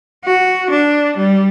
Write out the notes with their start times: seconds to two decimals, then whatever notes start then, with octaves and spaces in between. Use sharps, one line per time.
0.24 F#4
0.70 D4
1.16 G3